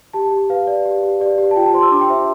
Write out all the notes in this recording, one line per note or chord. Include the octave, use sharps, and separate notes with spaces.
G4 A5
G4
B4 F5
D5
G4
G4
G4 D5
G4
A5
F4 G5
A5
C5 C6
E6
D4 D6
G5
C5 E5